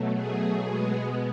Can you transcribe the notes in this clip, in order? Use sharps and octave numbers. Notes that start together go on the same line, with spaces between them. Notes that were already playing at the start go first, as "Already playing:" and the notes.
Already playing: B2 F#3 A3
G#4
B2 G#3 B3